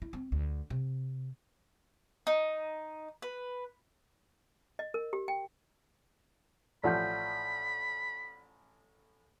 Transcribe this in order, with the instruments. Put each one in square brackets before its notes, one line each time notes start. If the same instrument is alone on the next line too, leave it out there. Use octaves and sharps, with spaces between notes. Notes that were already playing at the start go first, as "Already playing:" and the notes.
[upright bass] E4
C4
D2
C3
[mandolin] D#4
B4
[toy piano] D#5
A#4
G4
G5
[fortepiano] A1 F3 [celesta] D5 F#5 G6 [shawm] B5